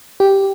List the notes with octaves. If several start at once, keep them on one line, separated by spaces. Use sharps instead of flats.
G4